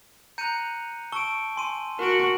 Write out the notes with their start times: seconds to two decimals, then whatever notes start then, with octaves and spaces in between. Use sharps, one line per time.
0.38 A#5 F#6 G6 C#7 D#7
1.12 A5 C#6 E6 D7 G7
1.56 G#5 C6 D#7
1.99 F#4 A#4 D7